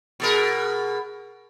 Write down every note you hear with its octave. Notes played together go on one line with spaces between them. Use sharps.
B2 G#4 A#4